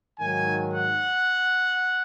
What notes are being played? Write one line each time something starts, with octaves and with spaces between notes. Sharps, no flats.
G#2 D#3 F#3 G#5
F#5